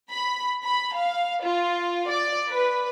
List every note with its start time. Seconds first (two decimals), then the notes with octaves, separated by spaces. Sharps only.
0.12 B5
0.63 B5
0.96 F5
1.44 F4
2.10 D5
2.51 B4